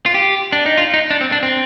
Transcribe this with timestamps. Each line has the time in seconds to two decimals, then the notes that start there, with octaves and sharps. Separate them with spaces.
0.06 F4
0.14 G4
0.53 D4
0.66 D#4
0.78 F4
0.94 D#4
1.11 D4
1.21 C4
1.32 D4
1.43 C4